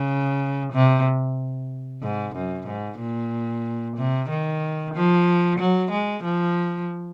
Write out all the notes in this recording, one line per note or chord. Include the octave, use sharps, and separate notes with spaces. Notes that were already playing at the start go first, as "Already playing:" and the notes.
Already playing: C#3
C3
G#2
F#2
G#2
A#2
C3
D#3
F3
F#3
G#3
F3